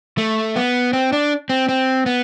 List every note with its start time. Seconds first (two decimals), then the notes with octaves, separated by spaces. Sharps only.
0.18 A3
0.56 B3
0.93 C4
1.13 D4
1.50 C4
1.69 C4
2.06 B3